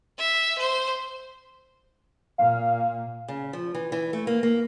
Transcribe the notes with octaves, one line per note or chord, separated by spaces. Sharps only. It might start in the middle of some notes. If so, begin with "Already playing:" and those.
E5
C5
A#2 F5
C#3
F3
E3
E3
A3
A#3
A#3